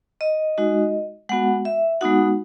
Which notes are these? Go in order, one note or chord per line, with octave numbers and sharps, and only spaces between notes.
D#5
G#3 D#4 F#4
G#3 B3 F#4 F#5
E5
G#3 B3 D#4 F#4 F#5